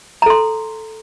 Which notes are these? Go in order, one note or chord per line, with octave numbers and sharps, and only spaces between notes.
A4 A#5 C6